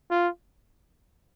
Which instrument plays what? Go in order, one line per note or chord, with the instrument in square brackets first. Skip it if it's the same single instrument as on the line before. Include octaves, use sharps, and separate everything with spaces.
[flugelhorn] F4